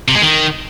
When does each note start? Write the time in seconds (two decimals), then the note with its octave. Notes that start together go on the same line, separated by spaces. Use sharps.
0.08 C3
0.15 G#3
0.22 D#3